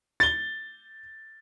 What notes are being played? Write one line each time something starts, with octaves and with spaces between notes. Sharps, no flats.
A6 G7